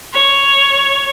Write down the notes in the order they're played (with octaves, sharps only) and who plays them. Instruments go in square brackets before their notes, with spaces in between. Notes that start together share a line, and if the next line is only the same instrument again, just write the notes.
[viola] C#5